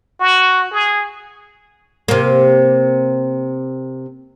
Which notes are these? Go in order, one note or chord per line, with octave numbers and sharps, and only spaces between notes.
F#4
G#4
C3 A#3